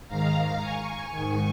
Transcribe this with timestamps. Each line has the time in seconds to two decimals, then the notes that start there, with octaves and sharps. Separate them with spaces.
0.08 G#2 D#3 F5 A#5
0.60 G#5 C#6
1.12 G#2 D#3